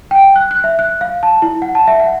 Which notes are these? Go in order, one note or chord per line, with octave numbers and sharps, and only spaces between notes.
G5
F#6
F#6
E5
F#6
F5
A5
E4
F#5
A5
E5
F#5